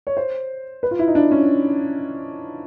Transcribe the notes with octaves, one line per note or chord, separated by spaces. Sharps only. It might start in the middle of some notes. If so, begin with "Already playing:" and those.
C#5
C5
B4
F4
E4
D#4
D4
C#4